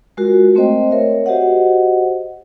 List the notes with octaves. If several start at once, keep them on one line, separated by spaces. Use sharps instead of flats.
G#3 F4 F#4 A#4
A3 C4 C5 D#5 G5
A#4 C#5 E5
F#4 G4 C5 D#5 F#5